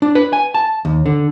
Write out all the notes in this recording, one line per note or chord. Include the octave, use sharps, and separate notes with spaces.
D4
B4
G#5
A5
D#2
D3